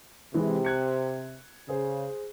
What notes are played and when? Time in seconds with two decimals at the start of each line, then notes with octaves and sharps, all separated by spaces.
0.34 C3 E3 G#3 E4
0.65 F#6 G#6 C#7
1.69 C#3 G#4 C5